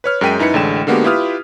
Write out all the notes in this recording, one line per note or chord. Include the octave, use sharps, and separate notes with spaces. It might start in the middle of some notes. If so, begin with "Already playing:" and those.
B4 C#5 F6
F#2 G#3 A#4 G5 B6 D#7
F#2 D#4 E4 B4 C#7
A1 D3 G#3 G5 E7
D3 G#3 A#3 B3 F#4 G4
E4 F4 G4 B4 D#6 F6